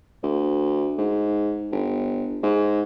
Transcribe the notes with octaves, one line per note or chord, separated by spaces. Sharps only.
D2
G#2
G1
G#2